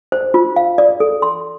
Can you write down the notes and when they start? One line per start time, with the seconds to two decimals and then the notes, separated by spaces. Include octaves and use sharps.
0.12 C5
0.34 F4
0.56 F5
0.78 D5
1.00 A4
1.22 C6